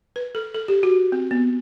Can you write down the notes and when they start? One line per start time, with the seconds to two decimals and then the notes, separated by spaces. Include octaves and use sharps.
0.16 B4
0.35 A4
0.55 A4
0.68 G4
0.83 F#4
1.12 C4
1.31 B3